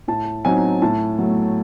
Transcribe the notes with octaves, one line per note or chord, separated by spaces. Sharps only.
A2 A5
F#3 C4 D#4 G#5
A2 A5
F#3 A3